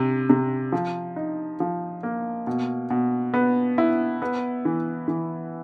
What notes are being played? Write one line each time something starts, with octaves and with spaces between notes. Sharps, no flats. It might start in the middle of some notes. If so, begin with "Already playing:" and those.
Already playing: C3
C3
F3
D#4
F3
A#3
B2
B2
B3
E4
B3
E3
E3